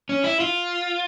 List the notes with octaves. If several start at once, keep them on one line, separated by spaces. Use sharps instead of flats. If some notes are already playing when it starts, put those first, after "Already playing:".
C#4
E4
F4